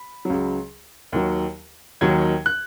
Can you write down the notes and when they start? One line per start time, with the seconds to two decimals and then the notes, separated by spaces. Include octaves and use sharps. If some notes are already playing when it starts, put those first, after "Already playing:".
Already playing: B5
0.25 C#2 C#3 F#3
1.13 D#2 D#3 F#3
2.01 D#2 D#3 F#3 G#6
2.46 F#6